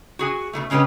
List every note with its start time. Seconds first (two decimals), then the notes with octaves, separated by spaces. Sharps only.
0.19 F#4 G#4 G#5
0.53 B2 F#3 A3
0.70 C#3 G#3 C#4 F#4 G4 B4